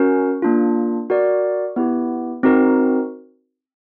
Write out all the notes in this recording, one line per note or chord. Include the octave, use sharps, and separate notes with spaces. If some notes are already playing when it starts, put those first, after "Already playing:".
Already playing: C#4 F#4 A#4
A#3 D4 F4
F#4 A#4 D5
B3 E4 G4
C4 D#4 F#4 A#4